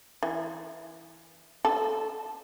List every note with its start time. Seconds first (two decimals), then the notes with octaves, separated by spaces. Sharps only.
0.23 E3
1.65 A4